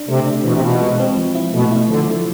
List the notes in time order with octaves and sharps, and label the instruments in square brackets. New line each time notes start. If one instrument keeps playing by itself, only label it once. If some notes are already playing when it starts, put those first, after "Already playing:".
Already playing: [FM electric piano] D4
[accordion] C3 [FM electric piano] A3
[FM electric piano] D4
[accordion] B2 [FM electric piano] E3
[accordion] C3
[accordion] B2 [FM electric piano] F4
[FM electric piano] G#3
C4
F3
E4
[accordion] B2 [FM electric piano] A3
[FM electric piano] E4
[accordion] D3 [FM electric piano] F3
[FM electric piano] F3